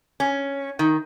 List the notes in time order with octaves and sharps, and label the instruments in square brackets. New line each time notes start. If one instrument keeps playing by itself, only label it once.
[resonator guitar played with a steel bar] C#4
D#3